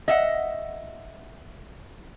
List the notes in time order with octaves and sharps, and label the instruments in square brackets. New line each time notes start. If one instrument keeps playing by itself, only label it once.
[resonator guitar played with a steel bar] D#5 E5 F#5